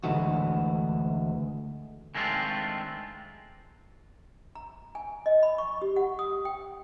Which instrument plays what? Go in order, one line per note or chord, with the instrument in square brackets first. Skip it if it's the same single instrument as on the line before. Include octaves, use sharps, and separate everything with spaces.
[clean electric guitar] D2 E3 G#3 A3 F#4
D#3 G#3 A3 C4 D4 F4
[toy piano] A#5
G#5
D#5
B5
C#6
G4
F#5
D#6
G5